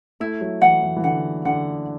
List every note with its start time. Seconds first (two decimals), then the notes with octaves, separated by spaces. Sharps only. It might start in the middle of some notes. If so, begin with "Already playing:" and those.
0.20 A3 E4
0.41 F#3
0.62 E3 F#5
0.83 E3
0.96 E3
1.04 D3 F#5
1.45 D3 F#5